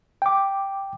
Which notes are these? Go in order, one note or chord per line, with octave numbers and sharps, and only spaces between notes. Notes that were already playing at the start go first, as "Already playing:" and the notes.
G5 D6